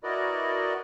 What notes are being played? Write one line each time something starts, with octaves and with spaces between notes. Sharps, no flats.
E4 F#4 A#4 B4 D5 D#5